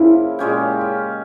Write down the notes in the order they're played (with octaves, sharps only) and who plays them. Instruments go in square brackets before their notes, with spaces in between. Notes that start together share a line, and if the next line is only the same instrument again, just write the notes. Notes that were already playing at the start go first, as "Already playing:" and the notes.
Already playing: [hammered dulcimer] C#3 F3 A#3 [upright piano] E4
[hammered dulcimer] A#2 G#3 C#4 G4